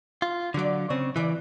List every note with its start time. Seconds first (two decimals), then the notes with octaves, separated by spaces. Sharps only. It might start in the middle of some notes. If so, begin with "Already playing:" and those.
0.22 F4
0.54 D3 F#3 F#4 D5
0.90 C#3 C4 C#4
1.16 C#3 E3 D5